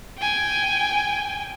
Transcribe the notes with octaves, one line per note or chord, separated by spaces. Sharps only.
G5 G#5